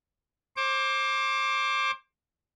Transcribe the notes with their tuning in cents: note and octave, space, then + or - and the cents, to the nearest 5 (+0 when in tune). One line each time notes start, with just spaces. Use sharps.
C5 +30 D6 +0